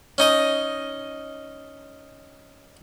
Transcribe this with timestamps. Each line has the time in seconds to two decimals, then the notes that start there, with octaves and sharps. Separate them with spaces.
0.18 C#4 D#4 D#5